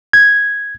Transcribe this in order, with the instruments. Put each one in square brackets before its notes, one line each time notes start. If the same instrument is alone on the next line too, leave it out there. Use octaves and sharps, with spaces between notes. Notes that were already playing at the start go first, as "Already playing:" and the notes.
[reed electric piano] G#6